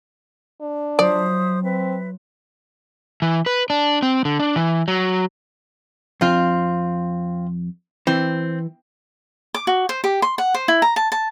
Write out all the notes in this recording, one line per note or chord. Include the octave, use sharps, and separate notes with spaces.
D4
F#3 F4 C5 D5 E5 D#6
C4 B4 E5
E3
B4
D4
C4
D3
D4
E3
F#3
F2 C4 F4
E3 C4
D6
F#4
C5
G4
C6
F#5
C5
E4
A#5
A5
A5